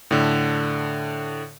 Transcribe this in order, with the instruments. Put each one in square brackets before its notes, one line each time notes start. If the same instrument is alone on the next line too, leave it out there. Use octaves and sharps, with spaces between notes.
[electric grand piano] A2 D3